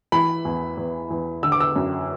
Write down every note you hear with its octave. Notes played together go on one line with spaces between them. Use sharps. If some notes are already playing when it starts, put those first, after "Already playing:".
E3 B5
E2
E2
E2
D3 E6
D6
E6
F#2